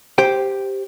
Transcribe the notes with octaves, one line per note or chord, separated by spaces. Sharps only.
G4 C5 G5